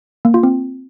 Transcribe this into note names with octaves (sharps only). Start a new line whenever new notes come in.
A#3
F4
C4